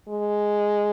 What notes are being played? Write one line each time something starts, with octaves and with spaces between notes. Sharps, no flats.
G#3